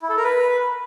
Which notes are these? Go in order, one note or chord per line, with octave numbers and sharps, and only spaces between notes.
E4
A4
A#4
B4